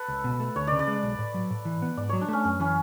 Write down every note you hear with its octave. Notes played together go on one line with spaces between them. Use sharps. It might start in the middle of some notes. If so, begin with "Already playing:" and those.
Already playing: A4 B4
C#2
B2
A3
D2 C#5
C#3 D5
D5
G#3
B1
A2
F#3
A2
E3
B3
G#2 D5
F#3 C#5
D4
A3 C#4
F#2 C#4
E3 C#4